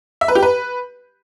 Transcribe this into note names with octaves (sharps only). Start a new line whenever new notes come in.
E5
B4
G4
B4